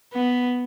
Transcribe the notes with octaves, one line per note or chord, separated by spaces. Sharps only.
B3